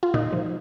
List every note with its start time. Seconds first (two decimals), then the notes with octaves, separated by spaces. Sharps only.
0.03 F4
0.14 A#2 D#4
0.33 F3